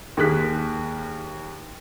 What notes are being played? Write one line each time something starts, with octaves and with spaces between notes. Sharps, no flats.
D#2 A#3 G#4 F#6 B6